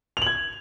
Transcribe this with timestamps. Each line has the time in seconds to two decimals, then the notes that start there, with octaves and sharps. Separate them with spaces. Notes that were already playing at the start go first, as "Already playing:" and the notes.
0.17 F7
0.22 F#7
0.26 G#6